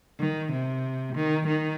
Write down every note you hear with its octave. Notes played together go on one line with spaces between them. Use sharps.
D#3
C3
D#3
D#3